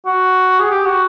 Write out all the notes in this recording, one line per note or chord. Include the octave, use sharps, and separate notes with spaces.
F#4
G#4
G4
F#4